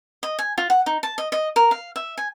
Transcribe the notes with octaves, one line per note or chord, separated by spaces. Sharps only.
D#5
G#5
F4
F#5
D#4
A5
D#5
D#5
A#4
F5
E5
G#5